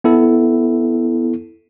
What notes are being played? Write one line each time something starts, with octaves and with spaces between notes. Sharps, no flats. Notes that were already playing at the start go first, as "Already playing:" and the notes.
B3 E4 A4